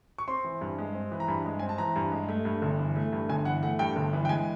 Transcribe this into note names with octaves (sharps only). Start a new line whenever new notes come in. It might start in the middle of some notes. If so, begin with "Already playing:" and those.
C#6
C4 C6
E3
G2
G#3
C4
E3
A#5
G2 B5
G#3
C4 G#5
A5
E3 A#5
G2
G#3
A3
G2
G1
E3
A3
G2
G1 G#5
E3 F#5
A3 F#5
G2 G5
G1
E3
G5
G#3 G#5